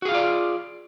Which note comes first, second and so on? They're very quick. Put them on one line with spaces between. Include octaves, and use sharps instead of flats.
F#4 G#4 F5 F4 D5